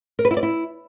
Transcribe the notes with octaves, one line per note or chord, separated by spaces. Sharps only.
A#4
B4
E4
D5
E4